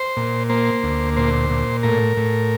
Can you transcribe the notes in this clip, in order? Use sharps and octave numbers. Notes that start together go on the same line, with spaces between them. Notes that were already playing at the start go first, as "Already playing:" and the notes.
Already playing: C5
A#2
A#3 C5
D2
A#2 C5
A#2
A2 A#4
A2